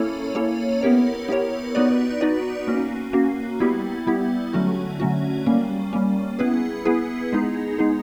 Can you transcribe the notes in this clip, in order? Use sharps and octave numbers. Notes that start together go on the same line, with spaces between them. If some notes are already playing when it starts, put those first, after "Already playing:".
Already playing: A#3 C#4 E4 A4 C#5
A#3 C#4 E4 A4 C#5
B3 E4 G4 A#4 C#5
B3 E4 G4 A#4 C#5
B3 D#4 F#4 B4 D5
B3 D#4 F#4 B4 D5
A#3 C#4 F#4
A#3 C#4 F#4
G3 B3 E4 G4
G3 B3 E4 G4
D3 F#3 A3 C#4 F#4
D3 F#3 A3 C#4 F#4
G3 A#3 C#4
G3 A#3 C#4
B3 E4 G#4 B4
B3 E4 G#4 B4
G#3 B3 D#4 G#4
G#3 B3 D#4 G#4